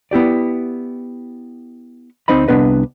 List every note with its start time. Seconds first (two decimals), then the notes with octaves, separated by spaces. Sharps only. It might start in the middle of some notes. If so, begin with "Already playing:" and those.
0.11 B3 E4 G4 D5
2.28 D2 C4 D#4 C5 D#5 B5
2.48 C2 D3 B3 D4 B4 D#5